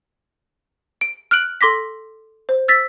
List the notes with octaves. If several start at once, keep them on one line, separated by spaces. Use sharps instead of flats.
D7
F6 F#6 D7 F#7
A4 C6 D6 A#6 B6
C5
E6 A6 B6